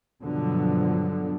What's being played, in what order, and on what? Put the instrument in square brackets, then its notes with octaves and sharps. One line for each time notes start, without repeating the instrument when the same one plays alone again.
[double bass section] G2 B2 D3 F3 F#3